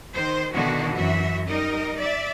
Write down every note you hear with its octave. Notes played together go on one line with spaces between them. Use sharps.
D#3 C5
B2 D3 D#3 B3 E4 F#4
F#2 E3 F#4 E5
G3 D#4 A#4 D#5
D5 E5